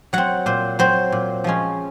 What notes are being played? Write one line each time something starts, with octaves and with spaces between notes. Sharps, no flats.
F#3 C4 F#5
A#2 C5
F#3 C4 C5
A#2
F3 G#3 C#4